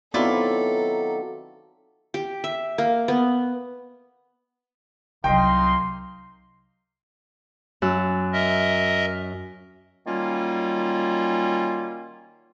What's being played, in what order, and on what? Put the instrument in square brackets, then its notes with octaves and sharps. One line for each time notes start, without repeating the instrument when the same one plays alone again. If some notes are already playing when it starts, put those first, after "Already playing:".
[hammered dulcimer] D#3 F#3 [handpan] B3 C4 [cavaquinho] E4 F4 D5 [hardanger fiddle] A4
[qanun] G4
E5
A#3
B3
[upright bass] C2 F#3 [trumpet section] A#3 D#4 C6 [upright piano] D#5 G5
[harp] F#2 E6 F#6
[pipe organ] A#4 D#5 E5
[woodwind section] D#3 F#3 G3 A#3 C#4 F4